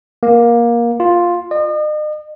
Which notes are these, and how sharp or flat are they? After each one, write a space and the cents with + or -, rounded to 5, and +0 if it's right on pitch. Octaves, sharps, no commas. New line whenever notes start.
A#3 +15
F4 +5
D#5 -40